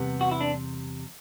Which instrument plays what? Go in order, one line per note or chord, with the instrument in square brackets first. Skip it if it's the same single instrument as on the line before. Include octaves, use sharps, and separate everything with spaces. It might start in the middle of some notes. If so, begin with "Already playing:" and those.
Already playing: [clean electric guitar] E2 C3 G3 B3
F#4
E4
D4